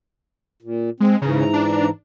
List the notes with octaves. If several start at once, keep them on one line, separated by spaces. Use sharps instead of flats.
A#2
G#3 C4
G#2 C#3 E3 A#5
D4